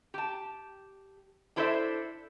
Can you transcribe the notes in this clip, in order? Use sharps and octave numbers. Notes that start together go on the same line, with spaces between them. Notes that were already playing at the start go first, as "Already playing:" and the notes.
G4 A5
D4 E4 A4 C5 D5 E5